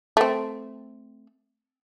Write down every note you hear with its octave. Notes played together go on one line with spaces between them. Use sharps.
A3 C4